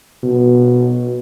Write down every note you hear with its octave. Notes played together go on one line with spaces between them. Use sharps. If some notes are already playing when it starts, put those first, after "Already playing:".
B2